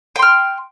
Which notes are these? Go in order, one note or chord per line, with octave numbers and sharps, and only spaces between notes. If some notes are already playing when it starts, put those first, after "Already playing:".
G5 C6 F6